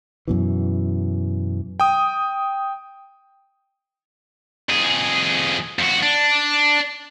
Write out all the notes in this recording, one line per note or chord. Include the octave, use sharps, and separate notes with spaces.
F#2 B2 E3
G5 D#6
F2 G#4
F2 F#4
D4